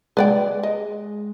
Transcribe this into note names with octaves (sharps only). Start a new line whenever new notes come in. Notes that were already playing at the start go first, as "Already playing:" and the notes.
G#3 B4 D5 G5
D#5